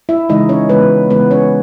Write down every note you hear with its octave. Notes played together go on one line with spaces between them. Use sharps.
E4 E5
C#3 E3 G#3 D#4 D#5
C#4 C#5
C#3 E3 G#3 B3 B4
C#3 E3 G#3 B3 B4
C#4 C#5